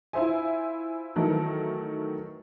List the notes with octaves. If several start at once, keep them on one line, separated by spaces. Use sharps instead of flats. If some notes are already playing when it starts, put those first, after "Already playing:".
E4 F4 C5 E5 G#5
D#3 E3 F#3 A3 A4 A#4